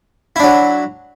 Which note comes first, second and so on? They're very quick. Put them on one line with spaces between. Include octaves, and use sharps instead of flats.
E4 D4 F#3